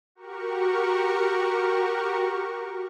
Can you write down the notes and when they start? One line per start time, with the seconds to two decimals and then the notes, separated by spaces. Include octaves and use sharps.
0.15 F#4 G4 A#4 C#6